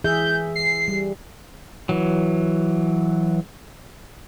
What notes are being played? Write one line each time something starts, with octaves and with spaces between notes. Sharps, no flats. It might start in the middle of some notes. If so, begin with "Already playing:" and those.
E3 G#4 E5 G6
C7
G3
E3 F#3